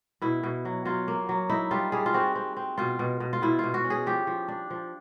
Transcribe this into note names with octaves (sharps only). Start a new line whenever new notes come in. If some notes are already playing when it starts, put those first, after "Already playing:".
B2 E4
B2
F#3
F#3 F4
A#3
F#3
D#4 E4
G3 F4
G3 G#4
F4
C4 F#4
C4
C4
B2 F4
B2
B2
F4
B2 E4
B2 F4
F#4
C#4
G#4
F3 G4
F3
D4
F3